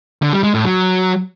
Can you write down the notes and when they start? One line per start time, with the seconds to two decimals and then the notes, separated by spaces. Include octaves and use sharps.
0.22 D3
0.33 G3
0.44 G#3
0.54 A2
0.65 F#3